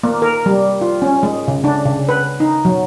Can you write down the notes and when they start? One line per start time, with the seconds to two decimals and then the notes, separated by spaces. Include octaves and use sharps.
0.03 A#3
0.22 A#4
0.46 G3
0.82 F4
1.02 C#4
1.23 G#3
1.48 C#3
1.64 D4
1.85 C#3
2.09 B4
2.40 D#4
2.65 F#3